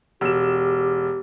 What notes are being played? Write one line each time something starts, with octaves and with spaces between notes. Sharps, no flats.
E1 G4 E7